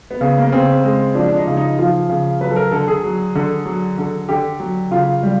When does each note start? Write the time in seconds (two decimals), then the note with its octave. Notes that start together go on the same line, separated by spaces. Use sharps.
0.11 B3
0.21 C#3
0.38 A#3
0.45 B3
0.52 C#3 C4
0.84 G#3
1.15 F3 D4
1.28 D4
1.36 D#4
1.47 C#3
1.57 D#4
1.79 F3 F4
2.09 C#3
2.41 F#3 B4
2.51 A4
2.56 A#4
2.72 D3 A4
2.88 G#4
3.04 F#3
3.35 D3
3.66 F#3
3.98 D3
4.29 D3 G4
4.60 F#3
4.91 C#3 F4
5.23 G3